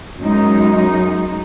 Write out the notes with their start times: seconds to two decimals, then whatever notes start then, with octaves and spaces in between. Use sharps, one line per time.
0.21 F#2 G#3 D#4